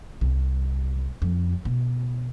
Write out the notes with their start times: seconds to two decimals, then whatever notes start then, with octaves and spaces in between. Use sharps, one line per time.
0.21 C2
1.22 F2
1.65 B2